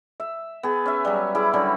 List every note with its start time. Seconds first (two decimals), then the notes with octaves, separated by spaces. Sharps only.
0.20 E5
0.63 B3 G#4
0.86 C#4 E5
1.05 F#3 G3
1.35 E4 G#4 D6
1.54 D3 F#3 G3 C#4